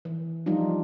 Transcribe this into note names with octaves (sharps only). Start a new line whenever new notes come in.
E3
F3 G3 D4 D#4 F4